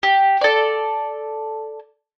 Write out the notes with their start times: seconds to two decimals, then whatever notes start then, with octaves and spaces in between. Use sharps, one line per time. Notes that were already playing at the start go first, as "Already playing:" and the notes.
0.03 G4
0.41 A4 D5